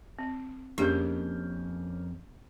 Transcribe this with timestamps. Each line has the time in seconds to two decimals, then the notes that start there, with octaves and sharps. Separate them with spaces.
0.19 C4
0.78 F2 A#3 C#4 D4 G4 G#4 G6